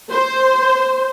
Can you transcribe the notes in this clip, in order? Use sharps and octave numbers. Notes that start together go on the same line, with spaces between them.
C5